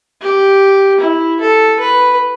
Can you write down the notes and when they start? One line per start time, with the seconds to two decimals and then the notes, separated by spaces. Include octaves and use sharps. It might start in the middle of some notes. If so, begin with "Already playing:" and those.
0.21 G4
1.00 E4
1.40 A4
1.80 B4